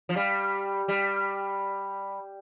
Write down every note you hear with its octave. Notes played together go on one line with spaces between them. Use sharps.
F3
G3
G3